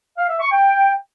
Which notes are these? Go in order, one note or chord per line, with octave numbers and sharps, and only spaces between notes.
F5
E5
C#6
G5